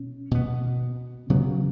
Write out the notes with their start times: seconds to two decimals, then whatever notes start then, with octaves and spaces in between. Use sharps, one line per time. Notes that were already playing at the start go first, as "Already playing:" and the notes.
Already playing: B2 C#4
0.31 B2 B3
1.30 C#3 F#3 B3